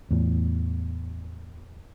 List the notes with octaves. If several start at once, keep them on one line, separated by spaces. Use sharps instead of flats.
E2 A2